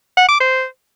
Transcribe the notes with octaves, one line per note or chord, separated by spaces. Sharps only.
F#5
D6
C5